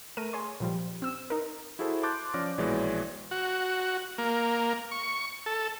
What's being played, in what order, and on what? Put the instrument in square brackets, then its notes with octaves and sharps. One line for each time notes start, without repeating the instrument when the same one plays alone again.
[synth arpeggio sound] A3 A#4 D#7
G#4 C#5 C6
A#2 F3 G3
C4 E6
D#4 A#4
[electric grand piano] E4 F#4 G#4 A4 C5
A5 C6 D6 F#6 G6 A6
F3 C#4 D5 D6 F6 A#6
A#1 B2 E3 G#3 C#5 D5
[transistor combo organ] F#4
A#3
C#6
A4